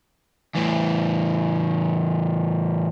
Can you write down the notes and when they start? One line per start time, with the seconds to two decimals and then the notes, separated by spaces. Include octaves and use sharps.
0.55 E2 A2